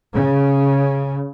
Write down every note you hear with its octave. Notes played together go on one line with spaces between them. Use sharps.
C#3